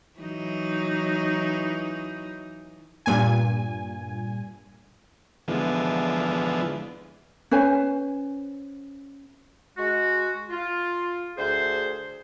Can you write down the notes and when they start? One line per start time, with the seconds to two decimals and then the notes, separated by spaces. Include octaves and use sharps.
0.19 E3 F#3 D#4
3.06 G2 A#2 G#5
5.48 D3 E3 F3 G#3 B3
7.51 C#4 B4 C5 G#5
9.77 G#3 F#4
10.50 F4
11.37 D2 G#4 C5